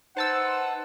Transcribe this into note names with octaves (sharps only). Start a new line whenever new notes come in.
D#4 B4 C5 F#5 A5 E6